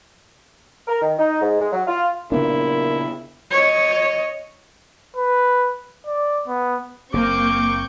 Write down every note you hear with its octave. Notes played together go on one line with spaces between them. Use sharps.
A#4
D#3
D#4
G#2
G#3
F#3
F4
A#2 C#3 B3 D4 E4
C#5 D#5
B4
D5
B3
F#1 A#3 C4 C#6 D6 G6